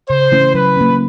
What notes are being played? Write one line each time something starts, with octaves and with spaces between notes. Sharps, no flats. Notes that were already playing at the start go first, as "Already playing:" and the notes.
C#3 C5
E3 A3 C#4 E4
F#3 B4
A#3 C#4